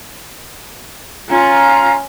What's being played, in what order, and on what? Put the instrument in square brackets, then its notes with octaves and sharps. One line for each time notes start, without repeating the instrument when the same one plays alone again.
[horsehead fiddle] C#4 [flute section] F4 A#5